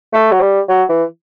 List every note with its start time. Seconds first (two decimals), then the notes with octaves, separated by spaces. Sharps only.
0.13 A3
0.32 F#3
0.41 G3
0.69 F#3
0.89 E3